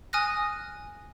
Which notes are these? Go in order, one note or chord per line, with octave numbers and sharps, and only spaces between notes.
G#5 D#6 F6 F#6 A#6